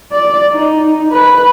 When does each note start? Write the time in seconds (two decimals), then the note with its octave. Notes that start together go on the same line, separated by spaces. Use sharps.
0.12 D5
0.53 D#4
1.12 B4